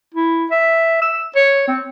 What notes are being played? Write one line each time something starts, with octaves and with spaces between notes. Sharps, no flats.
E4
E5
E6
C#5
C4